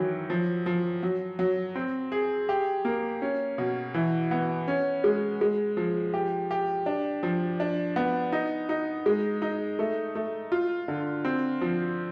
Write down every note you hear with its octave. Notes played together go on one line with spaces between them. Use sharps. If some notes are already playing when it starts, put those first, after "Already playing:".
Already playing: D#3 E3 F#3
F3
F3
F#3
F#3
C4
G#4
G4
A#3
C#4
B2
E3
B3
C#4
G#3
G#3
F3
G4
G4
D4
F3
D4
B3
D#4
D#4
G#3
D#4
A3
A3
F4
D3
C4
F3